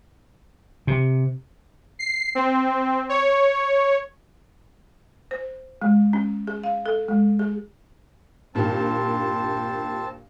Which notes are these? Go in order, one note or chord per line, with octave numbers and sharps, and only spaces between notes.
C3
C7
C4
C#5
C5
G#3
C#4
G#4
F5
A4
G#3
G#4
G2 A#2 D#3 C4 A5